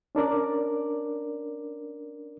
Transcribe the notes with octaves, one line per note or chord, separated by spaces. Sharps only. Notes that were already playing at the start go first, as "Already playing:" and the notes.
C#4 D4 A#4 D5